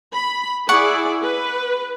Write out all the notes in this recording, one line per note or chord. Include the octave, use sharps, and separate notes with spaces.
B5
E4 G#4 D5 F#5 C#6
B4